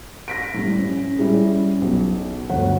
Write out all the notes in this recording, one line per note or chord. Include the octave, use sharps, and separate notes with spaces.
A#6 B6 D7
A2 G3
C#4
G3 C#4 E4 G4 G#4
B1
G1 D2 C#5 F#5